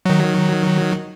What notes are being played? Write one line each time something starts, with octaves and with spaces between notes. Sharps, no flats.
D#3 F#3